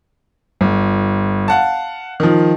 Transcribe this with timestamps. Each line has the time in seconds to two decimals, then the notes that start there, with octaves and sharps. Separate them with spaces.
0.61 G1
1.48 F5 F#5 A5
2.20 D#3 F3